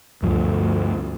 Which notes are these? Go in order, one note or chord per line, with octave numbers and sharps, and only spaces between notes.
D2 G2 F3